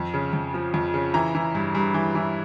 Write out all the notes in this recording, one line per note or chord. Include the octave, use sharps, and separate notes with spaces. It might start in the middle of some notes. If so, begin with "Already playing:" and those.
Already playing: F2
C#3
F2
F3
F2
C#3
E3 A#5
E3
G2
G2
E3
E3